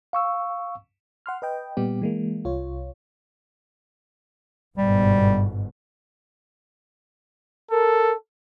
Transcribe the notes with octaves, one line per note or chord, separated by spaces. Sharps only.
F5 C#6 E6
F#5 C6 F6
B4 D#5 G5
A#2 G3 B3 G4
E3 G#3 A#3
C2 F4 C#5
G1 G#2 B2 G3
A4 A#4